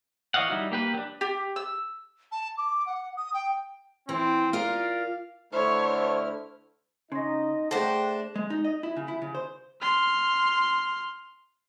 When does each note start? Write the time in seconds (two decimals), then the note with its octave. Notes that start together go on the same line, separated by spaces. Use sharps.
0.34 E3 C#5 D#5 F5 F#5
0.48 G3 D#4 E4 F#4
0.72 A#3 G4 B4
0.94 F#3 D4
1.21 G4
1.56 E6
2.32 A5
2.57 D6
2.86 F#5
3.17 D#6
3.34 G5
4.09 E3 C4
4.53 F4 A#4 D5 F5
5.53 D3 A3 E4 C5 C#5 F6
7.12 C#3 D#4 D#5 C6 A#6
7.71 A3 D4 G#4 A4 C5 F#5 G5 A#6
8.36 G#3
8.50 D#4
8.64 D#5
8.83 E4
8.97 C#3
9.08 E4
9.22 C#3
9.35 C5
9.81 C6 F6